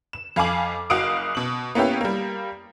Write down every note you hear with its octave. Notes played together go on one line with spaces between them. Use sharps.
E7
F2 F5 G#5 D6 F#7
F#1 F#4 F5 D#6 D7
B2 F#7
A#3 B3 C#4 E4 G4
G3 A#3